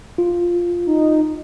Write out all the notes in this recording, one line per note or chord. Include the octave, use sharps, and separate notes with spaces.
F4
D#4